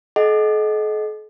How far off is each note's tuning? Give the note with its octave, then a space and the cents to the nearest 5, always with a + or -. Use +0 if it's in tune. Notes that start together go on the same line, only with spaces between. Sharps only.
A4 -45 D#5 +0 F#5 +5